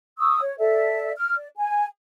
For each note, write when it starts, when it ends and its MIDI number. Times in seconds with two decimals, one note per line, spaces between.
0.19 0.40 85
0.19 0.40 87
0.19 0.40 88
0.41 0.54 73
0.59 1.11 69
0.59 1.11 74
0.59 1.11 76
1.16 1.34 89
1.35 1.48 74
1.56 1.86 80